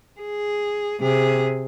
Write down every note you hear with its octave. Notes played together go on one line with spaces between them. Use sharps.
G#4
C3 G#4